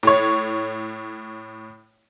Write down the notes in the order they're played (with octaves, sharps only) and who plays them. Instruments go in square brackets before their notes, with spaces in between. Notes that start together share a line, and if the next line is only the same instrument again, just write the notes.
[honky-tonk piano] A2 C#5